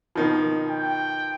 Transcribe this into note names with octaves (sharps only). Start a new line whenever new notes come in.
B2 D#3 F3
G5